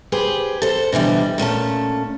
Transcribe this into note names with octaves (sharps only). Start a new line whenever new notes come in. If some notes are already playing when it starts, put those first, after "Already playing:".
G4 G#4 B4 C5
A4 C5
B2 D3 E3 G3
A#2 A3 C#4 A5